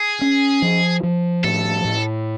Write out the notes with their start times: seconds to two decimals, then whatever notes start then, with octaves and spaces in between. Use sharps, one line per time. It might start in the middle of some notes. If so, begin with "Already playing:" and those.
Already playing: G#4
0.21 C#4
0.62 F3
1.03 F3
1.44 A2 A4
1.85 A2